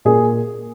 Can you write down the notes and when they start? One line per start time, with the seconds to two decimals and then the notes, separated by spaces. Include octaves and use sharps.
0.05 A#2 G#4